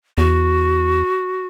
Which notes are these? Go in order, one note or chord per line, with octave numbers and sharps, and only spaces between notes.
E2 F#4